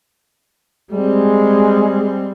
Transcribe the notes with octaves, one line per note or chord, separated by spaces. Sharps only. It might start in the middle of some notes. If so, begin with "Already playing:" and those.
G3 G#3 C4